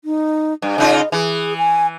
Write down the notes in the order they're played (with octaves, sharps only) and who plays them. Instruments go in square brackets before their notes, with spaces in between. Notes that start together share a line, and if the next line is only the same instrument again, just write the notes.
[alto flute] D#4
[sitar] G2
[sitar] C#3 D#4 F4 [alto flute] D#5
[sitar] E3 [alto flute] G#4
[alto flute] G#5